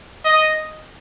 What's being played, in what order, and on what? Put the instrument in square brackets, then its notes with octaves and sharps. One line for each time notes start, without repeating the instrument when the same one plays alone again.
[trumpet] D#5